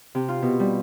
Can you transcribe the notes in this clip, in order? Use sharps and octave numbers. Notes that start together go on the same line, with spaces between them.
C3
F4
B2
G3